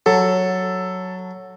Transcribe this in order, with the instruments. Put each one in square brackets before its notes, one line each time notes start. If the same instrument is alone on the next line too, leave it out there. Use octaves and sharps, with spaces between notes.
[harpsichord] F#3 [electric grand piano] A4